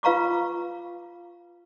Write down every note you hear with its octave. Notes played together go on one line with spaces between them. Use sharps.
F4 B4 F5 A#5 C#6 D6